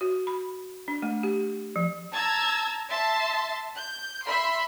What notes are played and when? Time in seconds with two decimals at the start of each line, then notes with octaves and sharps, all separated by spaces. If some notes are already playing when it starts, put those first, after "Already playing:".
0.01 F#4
0.27 B5
0.88 D4
1.02 A3
1.23 G4
1.76 F3
2.12 A5 A#5 E6 G#6
2.90 E5 A5 C6
3.74 G6
4.24 E5 B5 C6